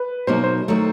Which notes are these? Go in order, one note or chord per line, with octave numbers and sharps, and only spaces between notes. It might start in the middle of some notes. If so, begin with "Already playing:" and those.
Already playing: B4
B2 F#3 A#3 D#4 C5
C5
D#3 F#3 A3